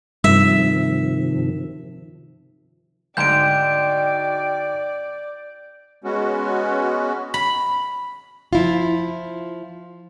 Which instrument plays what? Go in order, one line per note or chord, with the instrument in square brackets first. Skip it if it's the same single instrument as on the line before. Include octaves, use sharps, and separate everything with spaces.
[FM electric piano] G2 [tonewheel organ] C3 D#3 F3 [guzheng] E5
[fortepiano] D2 G#2 [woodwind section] D#4 F#4 G5 [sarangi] D5 [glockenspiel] G6 D7
[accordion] G#3 B3 C#4 F#4
[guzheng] B5
[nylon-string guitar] F3 E4 F4